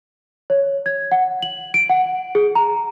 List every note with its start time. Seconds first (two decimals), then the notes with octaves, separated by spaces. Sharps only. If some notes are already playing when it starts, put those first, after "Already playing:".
0.50 C#5
0.86 G#6
1.12 F#5
1.42 F#7
1.74 D7
1.90 F#5
2.35 G#4
2.55 A#5